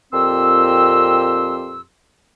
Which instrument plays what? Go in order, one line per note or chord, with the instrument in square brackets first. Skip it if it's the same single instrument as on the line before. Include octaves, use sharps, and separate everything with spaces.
[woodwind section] F2 A#2 C4 G4 C6 E6